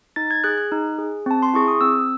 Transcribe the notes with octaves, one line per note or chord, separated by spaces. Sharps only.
D#4 A6
G#6
G#4 F#6
F#6
D#4
G#4
C4 A5
C6
E4 G#4 C#6
D#6
C4 E6